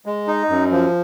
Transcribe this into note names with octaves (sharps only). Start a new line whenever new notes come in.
G#3
D#4
F#2
F3